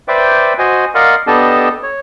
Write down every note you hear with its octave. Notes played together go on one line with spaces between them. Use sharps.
B4 C5 D5 E5 G5 D6
F#4 C5 D#5 G#5
A#4 D5 D#5 F5 F#5 C6
B3 D4 G4 A4 D#5 A5
C#5